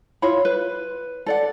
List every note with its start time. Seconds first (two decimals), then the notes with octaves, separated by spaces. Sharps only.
0.22 E4 F4 C#5 B5
0.45 B4
1.26 A4 D5 F#5